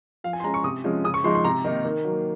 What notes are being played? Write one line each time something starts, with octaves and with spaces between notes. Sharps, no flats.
F3 F5
G#5
C6
G#3 C#4 A#5
C#6
C3 D#6
F3 G#3 C#4
C#3 D#6
C#6
F3 G#3 D#4 C6
C6
C3 A#5
D#3 A#3 D#4
D#3
F#3 A#3